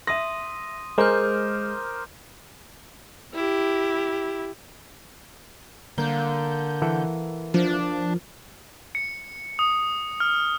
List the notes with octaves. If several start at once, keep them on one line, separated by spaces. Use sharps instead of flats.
E5 C6 D#6 A#6 D#7
G#3 A#4 C5 D6 F6 G6
E4 G4
D3 A#3 G6
E3 A4 F#5
F3 D4
C#7
D#6
F6